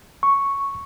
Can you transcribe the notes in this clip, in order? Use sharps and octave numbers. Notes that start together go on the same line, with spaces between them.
C#6